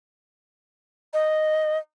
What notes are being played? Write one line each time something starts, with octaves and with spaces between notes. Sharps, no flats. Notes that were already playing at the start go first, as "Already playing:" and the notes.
D#5